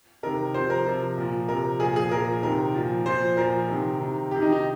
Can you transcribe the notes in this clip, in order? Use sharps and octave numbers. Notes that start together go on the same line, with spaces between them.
C3 D#3 A#4
C3 F3 C5
A#4
C3 F3
A#2 F3
C3 F3 A#4
A#2 F3 G#4
G#4
A#2 F3 A#4
C3 D#3 A#4
A#2 F3
A#2 F3 C5
A#2 F3 A#4
C3 D#3
C3 D#3
C3 D#3 G4
D#4
D#4